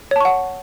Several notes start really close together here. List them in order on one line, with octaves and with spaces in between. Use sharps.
C#5 A5 C#6 F#5